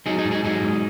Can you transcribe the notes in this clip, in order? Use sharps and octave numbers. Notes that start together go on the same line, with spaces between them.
F#3 D#4 G#4
D#4 G#4
G#2
D#4 G#4
F#3 D#4 G#4
G#2